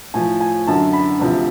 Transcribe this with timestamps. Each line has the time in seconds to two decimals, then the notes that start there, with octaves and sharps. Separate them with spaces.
0.14 A2 F3 G#5
0.40 G#5
0.67 F#2 D3 F#3 A5
0.93 B5
1.19 D2 C3 F3